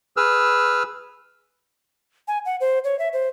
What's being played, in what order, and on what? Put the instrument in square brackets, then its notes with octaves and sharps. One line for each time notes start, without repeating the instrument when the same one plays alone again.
[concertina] G#4 B4 E6 F6
[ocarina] G#5
F#5
C5
C#5
E5
C5